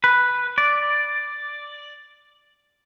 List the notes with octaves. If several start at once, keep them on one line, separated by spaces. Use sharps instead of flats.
B4
D5